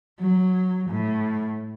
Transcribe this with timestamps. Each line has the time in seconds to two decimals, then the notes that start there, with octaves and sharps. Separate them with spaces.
0.19 F#3
0.89 A2